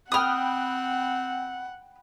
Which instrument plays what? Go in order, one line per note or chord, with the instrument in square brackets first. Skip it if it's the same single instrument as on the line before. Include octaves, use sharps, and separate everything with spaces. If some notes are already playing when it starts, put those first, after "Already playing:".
[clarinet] C4 [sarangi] F#5 [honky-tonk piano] G5 B5 F#6 [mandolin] D#6 F6